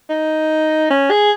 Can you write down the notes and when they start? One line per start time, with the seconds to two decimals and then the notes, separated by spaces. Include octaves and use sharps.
0.10 D#4
0.91 C#4
1.11 G#4